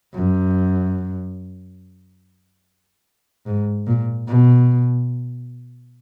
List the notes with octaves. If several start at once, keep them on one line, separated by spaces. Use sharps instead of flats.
F#2
G#2
A#2
B2